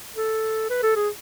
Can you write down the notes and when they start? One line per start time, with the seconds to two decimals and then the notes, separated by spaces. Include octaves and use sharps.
0.16 A4
0.70 B4
0.83 A4
0.96 G#4